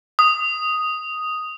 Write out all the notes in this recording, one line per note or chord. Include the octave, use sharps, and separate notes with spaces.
D#6